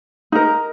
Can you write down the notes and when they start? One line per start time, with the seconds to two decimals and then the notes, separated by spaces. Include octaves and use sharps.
0.32 D#4 A#4